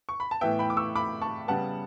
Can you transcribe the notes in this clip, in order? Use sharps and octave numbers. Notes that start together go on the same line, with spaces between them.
C#6
B5
A5
A2 E3 B3 E5 G5
G5 B5
D6
C#6 E6
B5 D6
A5 C#6
C#3 G3 B3 F#5 A5